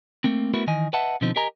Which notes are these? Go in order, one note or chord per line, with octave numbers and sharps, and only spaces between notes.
A3 A#3 C4
A3 B3 E4 F#4 A#4 B4
D#3 E3 D#5 G#5
B4 D#5 E5 F#5 A5
B2 D3 F3 C4 D#4
G4 A#4 D#5 G#5 A#5